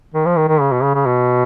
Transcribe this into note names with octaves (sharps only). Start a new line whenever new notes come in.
D#3
F3
D#3
D#3
C#3
B2
C#3
C#3
B2